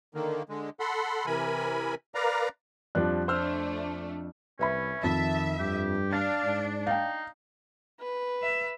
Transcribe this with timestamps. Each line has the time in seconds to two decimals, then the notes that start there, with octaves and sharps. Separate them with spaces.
0.15 D3 D#3 A#3
0.49 D3 G#3
0.80 A4 F#5 B5 C6
1.26 C3 E3 A#4 G#5 B5
2.15 A#4 B4 D5 F5 A#5
2.95 F2 F3 G3 D4 F#6
3.28 A3 D4 C5 E6 F6
4.59 C2 C#4 B4 E5 B5
5.04 F2 D#3 E5 A5
5.59 G2 G4
6.13 D4 F5 A6
6.44 G#2
6.87 D#4 F5 G5
8.01 B4
8.42 E5